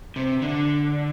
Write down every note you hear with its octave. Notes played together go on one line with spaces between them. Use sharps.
C3
D3